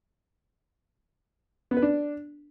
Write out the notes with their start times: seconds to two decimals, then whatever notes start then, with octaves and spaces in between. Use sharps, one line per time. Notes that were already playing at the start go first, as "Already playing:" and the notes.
1.71 B3
1.77 B4
1.82 D4